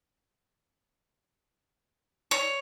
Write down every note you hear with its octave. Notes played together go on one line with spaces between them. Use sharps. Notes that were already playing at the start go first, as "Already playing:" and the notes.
C#5